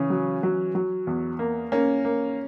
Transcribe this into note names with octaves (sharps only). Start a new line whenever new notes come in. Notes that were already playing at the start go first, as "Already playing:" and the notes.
Already playing: C#3 E3 C#4
F#3
F#3
F#3
E2
A#3
A#3 C#4
A#3